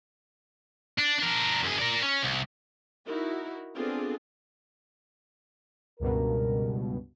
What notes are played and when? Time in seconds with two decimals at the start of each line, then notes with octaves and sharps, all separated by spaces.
0.98 D4
1.19 D4 A#4
1.63 F#2 G#4
1.79 A#4 D5
2.02 C#4
2.23 C2
3.06 D#4 E4 F#4 A#4
3.75 B3 C4 D4 F4 G#4 A4
6.00 C#2 G2 B2 A#4